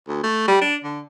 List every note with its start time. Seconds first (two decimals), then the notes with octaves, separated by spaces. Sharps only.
0.08 D2
0.23 A3
0.48 G3
0.62 D4
0.84 D3